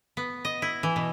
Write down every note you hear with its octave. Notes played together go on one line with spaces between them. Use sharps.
B3
D#5
E4
E3
B2